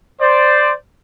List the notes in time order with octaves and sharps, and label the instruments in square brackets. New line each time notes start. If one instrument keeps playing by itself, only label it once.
[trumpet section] C5 D5